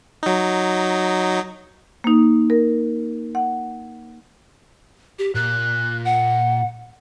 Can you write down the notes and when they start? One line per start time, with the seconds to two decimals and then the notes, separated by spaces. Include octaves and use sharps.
0.23 F#3 D#4
2.04 A#3 D#4
2.50 A#4
3.35 F#5
5.19 G4
5.35 A#2 F#6
6.05 F#5